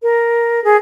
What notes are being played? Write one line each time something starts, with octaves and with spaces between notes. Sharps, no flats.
A#4
G#4